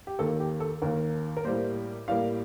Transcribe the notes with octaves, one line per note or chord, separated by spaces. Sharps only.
G4
D#2 D#3 A#3 A4
G4
A4
D#2 D#3 A#3 A#4
A#4
A2 G3 A#3 C5
A2 G3 A#3 F5